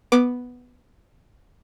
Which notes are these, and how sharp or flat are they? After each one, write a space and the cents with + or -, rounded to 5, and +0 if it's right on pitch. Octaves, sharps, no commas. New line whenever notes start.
B3 +0 D6 +5